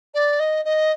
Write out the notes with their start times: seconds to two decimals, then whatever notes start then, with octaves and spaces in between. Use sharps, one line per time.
0.14 D5
0.39 D#5
0.65 D#5